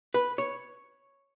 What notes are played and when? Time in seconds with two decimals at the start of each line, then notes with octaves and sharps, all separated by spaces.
0.14 B4
0.38 C#5